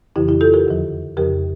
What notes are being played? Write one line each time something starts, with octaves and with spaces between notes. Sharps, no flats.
F2 C#3 E3 E4 G4
E4 G4
F4 A4
G4 A#4
E2 D3 F3
F2 C#3 F3 G4 A#4